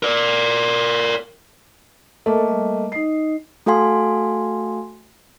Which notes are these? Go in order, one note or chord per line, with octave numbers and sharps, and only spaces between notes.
A#4 D5
A3 A#3 A4 D#5
G3 D#5
D#4 D#5 C7
A3 F#4 A4 F5 G#5 C6